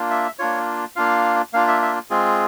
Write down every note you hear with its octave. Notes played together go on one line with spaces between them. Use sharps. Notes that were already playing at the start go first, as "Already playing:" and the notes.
Already playing: A#3 D4 F4
E5
A#3 D4 F4 C#5
A#3 D4 F4 F5
A#3 D4 F4 F5
E5
E5
G#3 C4 F4 G#4